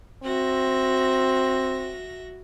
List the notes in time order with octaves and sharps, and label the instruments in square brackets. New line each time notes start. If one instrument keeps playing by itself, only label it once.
[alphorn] C4 [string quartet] F#4 E5 A#6